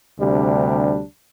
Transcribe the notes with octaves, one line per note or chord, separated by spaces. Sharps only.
D2 C3 G3 D4